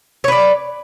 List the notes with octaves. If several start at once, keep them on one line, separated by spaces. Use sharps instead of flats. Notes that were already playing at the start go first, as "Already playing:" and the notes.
B4 C#5 D5